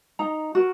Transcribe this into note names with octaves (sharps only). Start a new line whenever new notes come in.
D#4 A#5
F#4 A#4